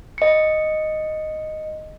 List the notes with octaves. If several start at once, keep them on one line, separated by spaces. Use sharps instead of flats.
D#5 C#7